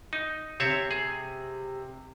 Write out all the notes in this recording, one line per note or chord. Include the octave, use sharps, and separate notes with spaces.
D#4
C3 C4 C#5 E5
G#4